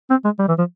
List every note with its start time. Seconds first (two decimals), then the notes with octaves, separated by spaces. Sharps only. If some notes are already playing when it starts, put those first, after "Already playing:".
0.10 C4
0.24 G#3
0.39 G3
0.48 E3
0.58 F3